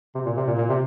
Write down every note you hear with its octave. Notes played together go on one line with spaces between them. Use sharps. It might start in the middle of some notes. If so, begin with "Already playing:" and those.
C3
A#2
C3
A#2
A#2
C3